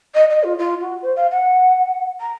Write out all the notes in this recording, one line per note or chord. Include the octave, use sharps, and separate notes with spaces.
D#5
D#5
F4
F4
F#4
C5
F5
F#5
A#5